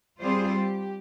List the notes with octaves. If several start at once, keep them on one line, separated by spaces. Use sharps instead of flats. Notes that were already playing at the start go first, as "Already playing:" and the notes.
G3 C4 F4 G#4 C5 D5
G4